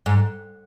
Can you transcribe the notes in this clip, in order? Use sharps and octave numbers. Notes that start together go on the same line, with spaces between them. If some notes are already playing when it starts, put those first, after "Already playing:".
G#2